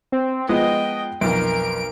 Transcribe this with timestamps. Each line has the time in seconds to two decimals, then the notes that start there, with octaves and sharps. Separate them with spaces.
0.12 C4
0.49 F3 G#3 B3 D#5 G5
1.21 B1 F2 A#4 D7